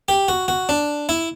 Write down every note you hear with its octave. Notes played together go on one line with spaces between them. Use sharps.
G4
F#4
F#4
D4
E4